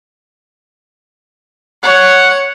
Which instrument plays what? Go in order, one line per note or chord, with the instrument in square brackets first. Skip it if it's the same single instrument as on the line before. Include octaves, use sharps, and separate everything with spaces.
[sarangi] C#5 [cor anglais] F#5